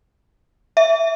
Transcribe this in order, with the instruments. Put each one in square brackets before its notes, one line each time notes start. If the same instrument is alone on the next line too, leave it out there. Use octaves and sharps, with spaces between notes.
[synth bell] E5